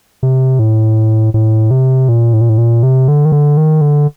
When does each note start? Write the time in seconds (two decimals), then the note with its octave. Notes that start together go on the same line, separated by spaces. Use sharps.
0.23 C3
0.59 A2
1.34 A2
1.71 C3
2.09 A#2
2.33 A2
2.41 A#2
2.49 A2
2.58 A#2
2.83 C3
3.08 D3
3.25 D#3
3.32 D3
3.57 D#3
3.81 D3